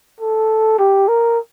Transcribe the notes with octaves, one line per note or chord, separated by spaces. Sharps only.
A4
G4
A#4